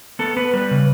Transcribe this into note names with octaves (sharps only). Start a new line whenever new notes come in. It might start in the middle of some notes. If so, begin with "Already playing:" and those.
B3 A4
B3 B4
G3 B4
C#3